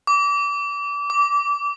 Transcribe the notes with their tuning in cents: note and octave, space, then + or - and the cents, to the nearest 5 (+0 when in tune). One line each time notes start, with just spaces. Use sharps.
D6 -30
D6 -20